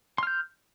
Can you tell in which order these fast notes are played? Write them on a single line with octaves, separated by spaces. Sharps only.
C6 F6 G6